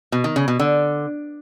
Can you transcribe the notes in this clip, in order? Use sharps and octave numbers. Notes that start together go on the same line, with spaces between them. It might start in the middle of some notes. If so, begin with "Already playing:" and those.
B2
D#3
C#3
B2
D3